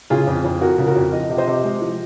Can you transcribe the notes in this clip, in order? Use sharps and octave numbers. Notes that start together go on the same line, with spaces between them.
C#3 F4 G#4
F2
F2
F3 F#4 A#4
C#3
F#4 A#4
F2
F3 D#5
C3
C5 D#5
C3
G#3
F3